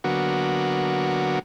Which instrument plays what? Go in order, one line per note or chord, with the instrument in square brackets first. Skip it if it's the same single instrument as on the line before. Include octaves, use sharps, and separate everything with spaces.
[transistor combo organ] D3 F#3 A#3 B3 F#4